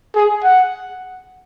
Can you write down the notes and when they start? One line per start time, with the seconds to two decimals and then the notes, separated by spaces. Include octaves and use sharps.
0.15 G#4
0.44 F#5